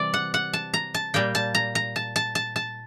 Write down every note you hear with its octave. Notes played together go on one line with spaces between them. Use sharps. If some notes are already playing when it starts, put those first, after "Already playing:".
Already playing: C3 E3 G3 D5
F#5
F#5
A5
A#5
A5
A#2 G3 A#3 G5
A5
A#5
A#5
A5
A5
A5
A5